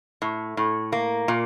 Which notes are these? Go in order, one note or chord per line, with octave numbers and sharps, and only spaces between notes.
A2
A2
A#3
A#2